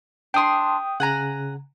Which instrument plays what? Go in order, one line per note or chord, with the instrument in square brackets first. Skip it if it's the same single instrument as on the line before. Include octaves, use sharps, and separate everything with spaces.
[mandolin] D4 C6 [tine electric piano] G5 D#6
[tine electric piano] C#3 [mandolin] F#5 G#5 A#5